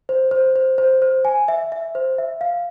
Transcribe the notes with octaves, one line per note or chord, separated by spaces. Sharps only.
C5
C5
C5
C5
C5
G#5
E5
E5
C5
E5
F5